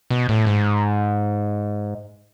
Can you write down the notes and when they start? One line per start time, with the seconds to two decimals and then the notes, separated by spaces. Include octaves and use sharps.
0.10 B2
0.29 A2
0.46 G#2